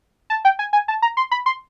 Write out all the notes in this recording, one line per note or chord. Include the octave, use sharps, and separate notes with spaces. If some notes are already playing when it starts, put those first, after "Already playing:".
A5
G5
G#5
G#5
A5
A#5
C6
B5
C6